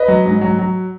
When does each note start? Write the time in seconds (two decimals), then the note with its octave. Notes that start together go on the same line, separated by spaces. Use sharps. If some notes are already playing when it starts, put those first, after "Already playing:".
Already playing: B4 D#5
0.08 F#3
0.25 G#2
0.41 F#3
0.59 F#3